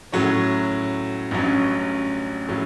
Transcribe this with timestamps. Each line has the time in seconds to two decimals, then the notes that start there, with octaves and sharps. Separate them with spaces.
0.12 A2 F#3 C#4 F#4 C#5
1.31 A1 G2 F#3 C#4
2.49 A2 F#3 C#4